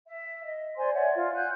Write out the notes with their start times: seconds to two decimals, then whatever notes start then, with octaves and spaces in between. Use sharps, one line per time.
0.06 E5
0.45 D#5
0.77 C5 D5 G#5 C6
0.93 C#5 D5 E5 F#5
1.15 F4 D5
1.35 F#5 G#5 F#6 G6